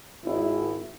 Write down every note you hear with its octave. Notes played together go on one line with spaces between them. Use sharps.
G#1 E4